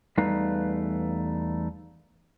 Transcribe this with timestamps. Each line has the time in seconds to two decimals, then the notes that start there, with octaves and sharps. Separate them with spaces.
0.18 E2 G3 A3 D#4 B4 F5